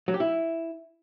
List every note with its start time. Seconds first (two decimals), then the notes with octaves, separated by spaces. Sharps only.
0.08 F#3
0.14 G4
0.20 E4